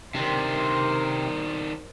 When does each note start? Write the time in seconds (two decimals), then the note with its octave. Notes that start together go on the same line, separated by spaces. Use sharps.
0.15 C3 D#3 D4 A#4 C5